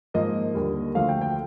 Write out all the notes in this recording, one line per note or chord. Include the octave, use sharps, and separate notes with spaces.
G#2 F3 A#3 D#5
D#2 D3 G3
D2 D3 F3 A3 F5
G5
G5